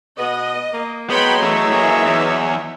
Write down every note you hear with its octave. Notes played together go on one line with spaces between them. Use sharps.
B2 B3 D#5
A#3
F#3 G#3 B3 C#5 G5 B5 C6
E3 A3 E5
A#3 G#4
E2